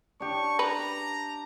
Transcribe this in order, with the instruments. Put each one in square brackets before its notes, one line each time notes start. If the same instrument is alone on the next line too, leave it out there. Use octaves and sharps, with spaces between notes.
[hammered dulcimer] D4 G4 [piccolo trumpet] C#6
[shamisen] B4 [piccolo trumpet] A#5